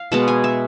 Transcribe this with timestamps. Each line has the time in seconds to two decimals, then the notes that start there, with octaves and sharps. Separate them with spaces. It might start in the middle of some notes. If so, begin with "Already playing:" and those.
Already playing: F5
0.12 B2 G#3 B3 A5
0.28 G#5
0.44 E5